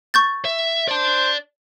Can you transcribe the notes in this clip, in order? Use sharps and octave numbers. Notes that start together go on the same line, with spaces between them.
C#6 G6 A6
E5
C5 D5 A5